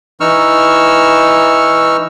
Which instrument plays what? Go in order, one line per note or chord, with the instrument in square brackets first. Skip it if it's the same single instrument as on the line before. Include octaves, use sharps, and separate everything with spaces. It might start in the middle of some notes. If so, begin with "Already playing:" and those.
[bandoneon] E3 D#4 C#6 E6 F6